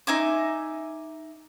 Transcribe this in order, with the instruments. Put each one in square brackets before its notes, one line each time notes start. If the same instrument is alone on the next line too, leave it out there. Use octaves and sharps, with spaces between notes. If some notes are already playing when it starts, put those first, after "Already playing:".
[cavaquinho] D#4 E5 G#5 D6